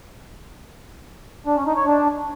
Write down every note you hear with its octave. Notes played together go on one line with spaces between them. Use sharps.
D4
C#4
D#4
C#5
D4